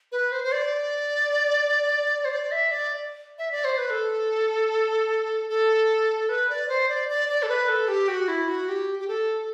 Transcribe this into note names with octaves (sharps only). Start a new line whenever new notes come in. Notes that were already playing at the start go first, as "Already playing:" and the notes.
B4
C5
C5
D5
C5
D5
E5
D5
E5
D5
C5
B4
A4
A4
B4
D5
C5
D5
D5
D5
A4
B4
A4
G4
F#4
E4
F#4
G4
G4
A4